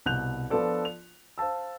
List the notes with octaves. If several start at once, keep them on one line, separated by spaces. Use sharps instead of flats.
C2 B2 F#6 G6 F7
F3 B3 D4 F4 A4 D5
F7
C5 F5 A5 E6